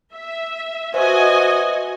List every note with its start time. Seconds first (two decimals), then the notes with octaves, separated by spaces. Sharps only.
0.13 E5
0.94 F#4 B4 C5 D#5 E5 G#5